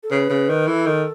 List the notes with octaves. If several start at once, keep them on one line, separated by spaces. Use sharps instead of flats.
A4
C#3 B4
C#3
D#3
E3 A4
D#3